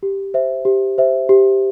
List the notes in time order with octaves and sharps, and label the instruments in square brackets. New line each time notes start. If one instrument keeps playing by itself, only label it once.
[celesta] G4
C5 E5
G4
C5 E5
G4